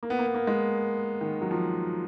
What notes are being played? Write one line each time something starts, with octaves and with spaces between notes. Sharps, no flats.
A#3
B3
A#3
B3
A#3
G#3
D#3
F#3
F3